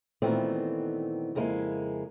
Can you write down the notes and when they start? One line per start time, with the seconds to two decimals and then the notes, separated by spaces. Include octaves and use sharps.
0.22 A#2 D#3 E3 A3 B3 C4
1.35 F2 C#3 G#3 A#3 E4